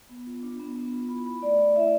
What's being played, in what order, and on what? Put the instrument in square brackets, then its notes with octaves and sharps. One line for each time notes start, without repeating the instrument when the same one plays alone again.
[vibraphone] B3
F4
D4
B3
B3
F4
E4 B5
E4 B5
A3 D5
A3 D5
E4 E5